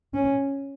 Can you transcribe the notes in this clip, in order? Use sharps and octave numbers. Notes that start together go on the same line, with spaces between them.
C#4